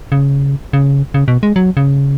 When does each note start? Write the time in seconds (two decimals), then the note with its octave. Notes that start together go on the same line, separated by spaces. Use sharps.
0.12 C#3
0.73 C#3
1.14 C#3
1.28 B2
1.43 G#3
1.56 F#3
1.77 C#3